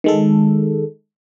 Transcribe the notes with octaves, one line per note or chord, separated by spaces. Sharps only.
D#3 G#3 A4